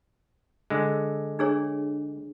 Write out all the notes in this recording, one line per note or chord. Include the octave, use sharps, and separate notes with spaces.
D3 G#3
D4 G#4 C#5